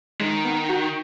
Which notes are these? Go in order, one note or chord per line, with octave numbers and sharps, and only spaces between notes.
D#3 G#3
B3
F#4